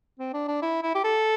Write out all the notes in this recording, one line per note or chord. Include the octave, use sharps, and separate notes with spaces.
C4
D4
D4
E4
E4
G4
A4